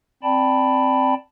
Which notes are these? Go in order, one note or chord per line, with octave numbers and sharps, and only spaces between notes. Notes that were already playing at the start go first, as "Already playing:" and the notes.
C4 D5 G5 A5 B5